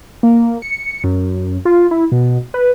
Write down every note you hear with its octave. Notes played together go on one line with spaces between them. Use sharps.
A#3
C#7
F#2
F4
E4
B2
B4